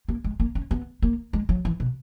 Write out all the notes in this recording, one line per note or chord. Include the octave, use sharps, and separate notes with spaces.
A#3
G#3
A#3
C#4
B3
A#3
G#3
F#3
E3
B2